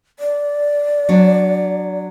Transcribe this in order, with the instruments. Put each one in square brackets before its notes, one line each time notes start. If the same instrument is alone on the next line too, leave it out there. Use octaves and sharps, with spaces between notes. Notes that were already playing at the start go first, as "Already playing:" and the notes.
[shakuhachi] D5
[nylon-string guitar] F#3 D4